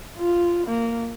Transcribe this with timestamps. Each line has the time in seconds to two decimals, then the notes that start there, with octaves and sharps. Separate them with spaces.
0.18 F4
0.67 A#3